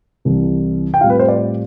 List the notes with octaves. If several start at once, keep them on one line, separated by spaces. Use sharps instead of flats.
C2 C3 E3
G5
A2 G3 C4 F4 F5
B4
C5
D5